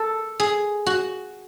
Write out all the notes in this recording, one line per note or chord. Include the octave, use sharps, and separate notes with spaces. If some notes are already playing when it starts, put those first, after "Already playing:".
Already playing: A4
G#4
F#4